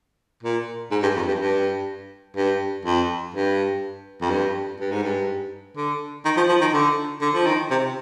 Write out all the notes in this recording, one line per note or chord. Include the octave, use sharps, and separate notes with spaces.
A#2
G#2
G2
F2
G2
G2
G2
F2
G2
F2
G2
G2
G#2
G2
D3
D#3
F3
F3
D#3
D3
D3
F3
D#3
C3